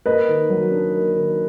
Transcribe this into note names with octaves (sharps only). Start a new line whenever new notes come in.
A#3 B4 D#5
D#3
F#3
D4
A#3
D#3